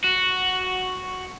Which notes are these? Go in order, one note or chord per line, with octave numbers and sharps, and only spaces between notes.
F#4